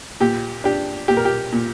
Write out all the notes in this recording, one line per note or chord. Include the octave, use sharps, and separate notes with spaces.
A#2 G4
D4 G4
A#2 G4
A#4
G4
A#2